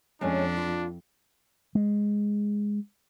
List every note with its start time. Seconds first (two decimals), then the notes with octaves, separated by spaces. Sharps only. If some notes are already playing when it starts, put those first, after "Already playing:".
0.21 F2 G#3 C#4 D4
0.57 F4
1.75 G#3